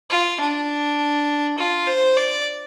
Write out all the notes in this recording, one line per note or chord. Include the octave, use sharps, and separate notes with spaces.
F4
D4
F4
C5
D5